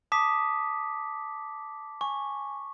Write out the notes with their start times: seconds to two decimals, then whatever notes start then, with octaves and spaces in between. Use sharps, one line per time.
0.12 A5 D6 D#6 B6
2.01 G#5 C#6